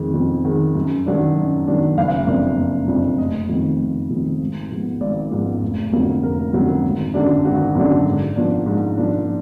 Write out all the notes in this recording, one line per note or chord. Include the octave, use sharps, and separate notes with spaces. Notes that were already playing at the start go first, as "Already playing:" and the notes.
Already playing: F2 D#3 G#3
F2
D#3 G#3
F#2
D#3 F#3 D4
F#2
D#3 F#3 D4
F#1 F5
F2 F3 A#3 D4
F#1
F2 F3 A#3 D4
F1 D#5
F2 D#3
F1
F2 D#3
G#1
G#2 F3 B3
G#1 D5
G#2 F3 B3
F1
F2 D3 F#3 A#3
F1 A#4
F2 D3 F#3 A#3
G#1
F#2 D3 F#3 D4
G#1 F#4
F#2 D3 F#3 D4
G#2
F3 A#3 D4
G#2
F3 A#3 D4